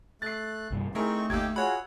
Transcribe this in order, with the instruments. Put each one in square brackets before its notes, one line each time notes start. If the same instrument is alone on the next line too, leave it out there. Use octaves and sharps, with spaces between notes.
[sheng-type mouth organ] A3 F#6 [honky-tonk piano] A6 C7
[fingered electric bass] C2 G2 A#2
[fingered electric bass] A3 [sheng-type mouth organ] C4 D#4 C#6 [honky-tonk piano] E4 G#4 A#4
[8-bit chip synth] G1 D#2 A#3 [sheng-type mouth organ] D#4 G4 G5 [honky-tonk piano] E6 G#6
[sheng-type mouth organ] F4 F#4 G#4 [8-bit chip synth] C#5 B5 [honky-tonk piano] F#5